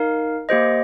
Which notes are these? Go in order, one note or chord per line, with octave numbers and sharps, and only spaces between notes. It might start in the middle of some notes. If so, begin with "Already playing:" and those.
Already playing: D#4 A#4 F5
A#3 G4 C5 D#5